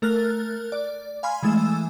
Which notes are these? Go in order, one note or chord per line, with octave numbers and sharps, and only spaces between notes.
A3 A#4 F6 F#6 A6
D5
F5 G#5 B5 C6 F6
E3 G#3 A3 G#5 E6 E7